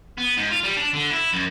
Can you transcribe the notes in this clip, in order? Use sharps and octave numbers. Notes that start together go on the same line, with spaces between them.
B3
G#2
F4
G3
D4
D3
E4
F#2